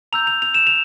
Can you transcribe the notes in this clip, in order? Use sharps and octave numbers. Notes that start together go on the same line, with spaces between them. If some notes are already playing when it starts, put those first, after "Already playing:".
A#5 E6 G6 F7
F7
F7
E7
F7